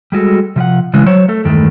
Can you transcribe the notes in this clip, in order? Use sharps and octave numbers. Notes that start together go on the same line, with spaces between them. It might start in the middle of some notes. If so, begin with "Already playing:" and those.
G3 G#3 F#4 A4
C3 F3 B4 F#5
C#3 E3 G#3
F#3 C5 C#5
A3 A4
E2 G2 D#3 G#3 A3